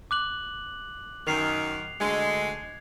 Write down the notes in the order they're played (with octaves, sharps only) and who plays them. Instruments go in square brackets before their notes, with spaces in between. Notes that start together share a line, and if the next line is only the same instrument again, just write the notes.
[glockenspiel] D6 F#6 F#7
[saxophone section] F#2 D#3 [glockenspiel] C7 F7
[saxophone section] D2 D3 G#3 [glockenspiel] G#6